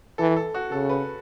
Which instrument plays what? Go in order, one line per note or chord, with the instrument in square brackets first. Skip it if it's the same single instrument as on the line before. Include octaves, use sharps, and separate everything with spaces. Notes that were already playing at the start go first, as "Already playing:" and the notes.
[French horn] E3 [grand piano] A4
[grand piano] A4
F#4
[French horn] C#3 [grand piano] A4
[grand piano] B4